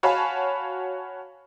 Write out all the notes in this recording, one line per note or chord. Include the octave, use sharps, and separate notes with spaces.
F#4 C#5 F5 G#5 A5 B5